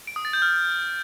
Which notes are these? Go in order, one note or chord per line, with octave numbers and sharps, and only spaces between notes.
D7
D#6
A6
G6
F6